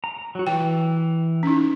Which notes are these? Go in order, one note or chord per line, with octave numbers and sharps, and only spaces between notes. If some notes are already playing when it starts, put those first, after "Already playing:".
A#5
F#3 F#4
E3 G5
C#4 D#4